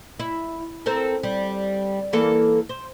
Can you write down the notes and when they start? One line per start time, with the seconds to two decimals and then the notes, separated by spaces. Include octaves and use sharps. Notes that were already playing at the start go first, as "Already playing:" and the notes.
0.20 E4
0.86 C4 A4 A#4
1.23 G3
2.13 E3 A#3 A4
2.69 C5